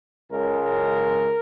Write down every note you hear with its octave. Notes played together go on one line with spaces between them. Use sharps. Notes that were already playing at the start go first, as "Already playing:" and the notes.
C#2 C#3 G#3 A#4
A#4